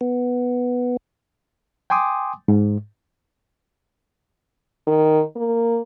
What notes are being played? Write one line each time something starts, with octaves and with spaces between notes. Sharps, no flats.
B3
G5 G#5 C6 D6 D#6
G#2
D#3
A#3